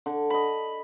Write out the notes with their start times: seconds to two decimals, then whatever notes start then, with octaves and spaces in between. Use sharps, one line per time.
0.06 D3
0.30 D#5 B5